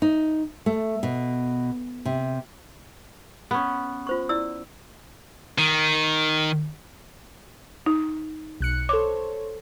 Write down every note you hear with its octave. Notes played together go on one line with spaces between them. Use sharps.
D#4
A3
B2
C3
B3 C#4
F4 C5 C#6
E4 D5 E6
D#3
D#4
B1 F#6 C#7
A4 C5 C#5 D6